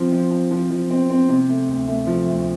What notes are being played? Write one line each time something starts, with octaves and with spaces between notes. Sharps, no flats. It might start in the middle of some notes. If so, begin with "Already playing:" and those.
Already playing: F3 C4
F3
F3
F3
F3
C4
C4
C3
A3
D2
A3
F3
D2